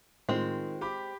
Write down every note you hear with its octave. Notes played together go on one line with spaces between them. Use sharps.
A2 D#3 G#3 C4 F4
G4 B5 D6